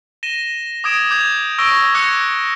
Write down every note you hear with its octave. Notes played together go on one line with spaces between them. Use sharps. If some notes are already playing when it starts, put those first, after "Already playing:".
A#6 D#7 E7 G7
D6 D#6 G#6 D7 E7
D6 G6 G#6 F7
C#6 E6 A#6 D7 G7
D6 E6 F#6 G#6 A#6 C#7